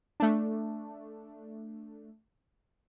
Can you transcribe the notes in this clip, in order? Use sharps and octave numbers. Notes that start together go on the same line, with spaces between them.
A3 D4